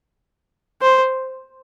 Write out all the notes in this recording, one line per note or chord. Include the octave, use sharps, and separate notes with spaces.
C5